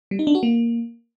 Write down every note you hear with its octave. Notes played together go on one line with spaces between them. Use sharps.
G3
D#4
D4
F#4
A#3